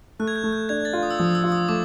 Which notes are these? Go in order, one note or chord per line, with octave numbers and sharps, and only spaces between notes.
A3 F#6
G#6
G6
A3
G6
D4 G#6
A6
F4
D#6
E6
F3 D#6
E6
F4
D#6
A3 D6